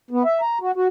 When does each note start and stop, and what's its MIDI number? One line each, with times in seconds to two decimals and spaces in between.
0.11 0.23 59
0.25 0.41 76
0.41 0.58 82
0.61 0.72 66
0.76 0.88 66